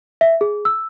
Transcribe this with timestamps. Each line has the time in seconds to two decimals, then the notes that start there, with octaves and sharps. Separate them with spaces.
0.21 E5
0.41 G#4
0.65 E6